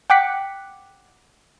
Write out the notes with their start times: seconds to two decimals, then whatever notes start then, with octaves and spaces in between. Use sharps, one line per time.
0.10 F#5 G5 D6 F#6 B6 C#7